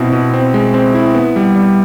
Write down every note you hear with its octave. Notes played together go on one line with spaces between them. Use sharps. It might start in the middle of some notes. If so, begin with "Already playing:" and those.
Already playing: B2 C4 E4
B2
C4
G#3
C4
E4
B3
G3
G3